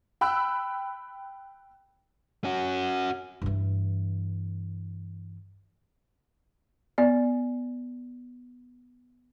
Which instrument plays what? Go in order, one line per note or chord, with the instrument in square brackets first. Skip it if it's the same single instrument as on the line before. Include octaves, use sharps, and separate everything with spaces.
[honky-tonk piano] G5 B5 E6 F#6
[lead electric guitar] C#4 F#4
[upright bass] G2 E3
[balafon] B3 D5